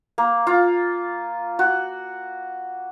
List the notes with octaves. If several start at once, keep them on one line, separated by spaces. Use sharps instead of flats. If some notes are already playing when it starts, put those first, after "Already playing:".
A#3
F4
F#4